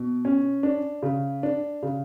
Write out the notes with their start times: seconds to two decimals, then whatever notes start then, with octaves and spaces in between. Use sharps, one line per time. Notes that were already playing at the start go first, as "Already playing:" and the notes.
Already playing: B2
0.25 C#4
0.63 D4
1.03 C#3
1.43 D4
1.83 C#3